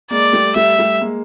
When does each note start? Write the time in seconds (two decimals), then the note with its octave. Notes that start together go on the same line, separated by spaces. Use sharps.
0.11 G#3 A#3 D5
0.33 G3 A3
0.56 G3 A3 E5
0.78 G3 A3
1.01 G#3 A#3